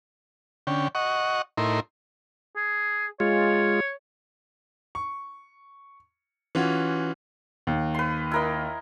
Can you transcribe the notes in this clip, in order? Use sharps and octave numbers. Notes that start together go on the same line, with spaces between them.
D3 C#4 G5
D#5 F#5 C#6
A2 D#4 E4 A#4 C6
G#4
G#3 F4 C#5
C#6
E3 C#4 F4 F#4
D#2
B4 C6
E4 A#4 D#5